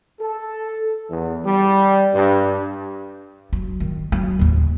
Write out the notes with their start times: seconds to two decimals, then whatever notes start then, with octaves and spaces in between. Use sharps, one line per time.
0.20 A4
1.08 E2
1.45 G3
2.13 G2
3.53 F#3
3.80 D#3
4.12 F#3
4.39 D#2 A2